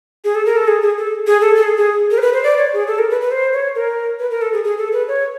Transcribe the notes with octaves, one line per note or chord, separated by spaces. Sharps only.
G#4
A4
A#4
A4
G#4
G#4
A4
G#4
A4
A4
G#4
G#4
A#4
C5
B4
C5
D5
C#5
G#4
A4
A#4
B4
B4
C5
C#5
A#4
B4
A#4
A4
G#4
G#4
A4
B4
C#5